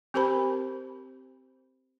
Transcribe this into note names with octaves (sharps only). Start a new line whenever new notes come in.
C4 G4 A#4 C5 A5 B5